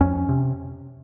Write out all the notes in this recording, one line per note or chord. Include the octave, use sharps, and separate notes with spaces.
F2 C#4
C3